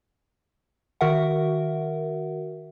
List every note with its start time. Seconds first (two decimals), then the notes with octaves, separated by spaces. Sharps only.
1.01 D#3 F#4 A#4 E5 F#5